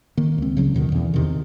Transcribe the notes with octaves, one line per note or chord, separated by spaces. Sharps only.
D#3 A#3
C#2 C4
C#3 F#3 A3 C#4
D#2 B2 D3 D#3
E2
E2 C3 D#3